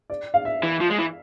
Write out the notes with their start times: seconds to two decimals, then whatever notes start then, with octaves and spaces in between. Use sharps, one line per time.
0.10 D5
0.34 F5
0.45 E5
0.63 E3
0.81 F3
0.90 G#3
0.99 E3